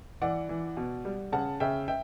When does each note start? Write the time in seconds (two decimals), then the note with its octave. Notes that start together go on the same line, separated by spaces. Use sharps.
0.22 E3 D5 F#5
0.49 E3
0.77 B2
1.05 G3
1.32 C#3 F#5 A5
1.60 C#3 E5 G5
1.88 E5 G5